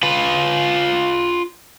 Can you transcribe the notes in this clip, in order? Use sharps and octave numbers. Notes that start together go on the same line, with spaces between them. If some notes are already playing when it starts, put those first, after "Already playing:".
F4 B4